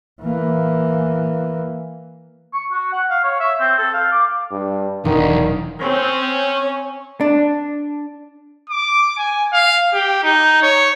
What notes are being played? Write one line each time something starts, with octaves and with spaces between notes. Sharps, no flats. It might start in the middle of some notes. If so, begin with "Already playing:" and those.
E3 A#3
C#6
F#4
F#5
F5
C#5
E5
C4
A4
F5
D6
G2
E1 B1 D#3 D4
C4 C#4 C#5
D4
D6
G#5
F5
G4
D#4
C#5